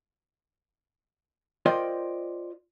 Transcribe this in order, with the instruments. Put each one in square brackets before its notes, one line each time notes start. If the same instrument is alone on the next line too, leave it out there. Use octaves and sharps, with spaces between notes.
[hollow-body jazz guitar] F4 A#4 C5 D5 D#5 G5